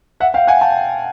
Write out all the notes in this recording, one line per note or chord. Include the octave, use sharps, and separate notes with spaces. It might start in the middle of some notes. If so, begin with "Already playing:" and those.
E5 F#5
F5 G5
F#5 G#5
G5 A5